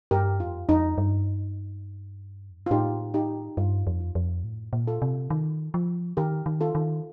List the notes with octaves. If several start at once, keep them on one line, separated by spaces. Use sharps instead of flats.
G2 G4 A#4
F2 F4
F2 D#4
G2
F2
G2
F4
A2 D#4 G4
D#4 G4
G2 F4
F2
F4
F2
A2
A#2
F4 A4
C3
D#3
F3
D#3 G4 A#4
D#3
F4 A4
D#3